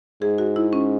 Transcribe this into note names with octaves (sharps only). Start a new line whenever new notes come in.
G#2 G#4
F#4
E4
C#4